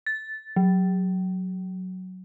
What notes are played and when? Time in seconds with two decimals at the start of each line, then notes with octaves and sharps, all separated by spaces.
0.06 A6
0.56 F#3